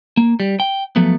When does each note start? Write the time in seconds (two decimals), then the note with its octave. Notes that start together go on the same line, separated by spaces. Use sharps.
0.17 A#3
0.40 G3
0.60 G5
0.96 F3 F#3 A3 B3